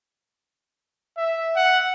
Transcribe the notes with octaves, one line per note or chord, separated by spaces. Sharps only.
E5
F#5